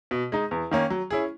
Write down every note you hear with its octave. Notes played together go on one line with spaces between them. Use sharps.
B2
G#3 D#4
E2
D#3 A#3 C#4
F#3
C#4 E4 G#4